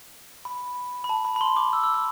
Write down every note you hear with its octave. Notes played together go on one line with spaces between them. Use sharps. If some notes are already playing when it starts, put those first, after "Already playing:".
B5
B5
A5
B5
B5
C6
D6
E6
E6
E6